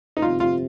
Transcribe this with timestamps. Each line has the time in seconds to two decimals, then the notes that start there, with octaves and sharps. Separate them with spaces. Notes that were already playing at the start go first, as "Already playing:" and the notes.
0.17 D#4
0.22 G1 F2 C3 F4
0.40 F4